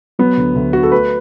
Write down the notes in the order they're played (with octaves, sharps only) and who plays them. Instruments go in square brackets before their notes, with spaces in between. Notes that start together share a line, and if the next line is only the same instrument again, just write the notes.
[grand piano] F#3 B3
D2
D2
D3 F#4
A4
A3 B4